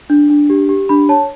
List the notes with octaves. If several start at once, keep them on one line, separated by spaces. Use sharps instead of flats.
D4
D4
G4
G4
D4 B5
C#5 A5